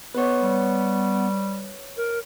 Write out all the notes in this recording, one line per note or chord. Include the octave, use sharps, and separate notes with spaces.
B3 B4 C#5
G3
A#4